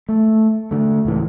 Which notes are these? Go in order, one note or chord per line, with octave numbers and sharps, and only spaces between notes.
A3
D3 A3
C#2 A2 E3